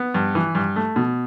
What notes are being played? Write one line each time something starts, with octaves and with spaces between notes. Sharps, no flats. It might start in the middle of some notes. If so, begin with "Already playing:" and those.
Already playing: B3
G2
E3
G2
A3
B2